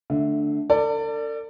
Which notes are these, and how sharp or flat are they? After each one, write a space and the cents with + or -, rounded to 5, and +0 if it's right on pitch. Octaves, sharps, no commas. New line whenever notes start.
D3 +0 A3 +0 E5 -20
A4 +45 D5 +0